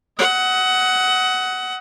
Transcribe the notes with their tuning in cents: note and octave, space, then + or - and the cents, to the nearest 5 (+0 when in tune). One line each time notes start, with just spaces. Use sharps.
D#5 +30 F#5 +15